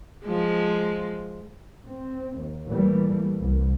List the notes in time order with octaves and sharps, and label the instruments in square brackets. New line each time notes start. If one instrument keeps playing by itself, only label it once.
[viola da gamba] F3 G#3
[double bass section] C4
D#2
A#2 E3 G3 A3
C2